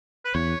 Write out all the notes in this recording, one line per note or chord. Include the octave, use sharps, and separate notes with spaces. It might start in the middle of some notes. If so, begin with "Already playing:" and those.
B4
E2 C#5